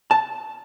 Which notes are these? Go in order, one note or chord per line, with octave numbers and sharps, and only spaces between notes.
A5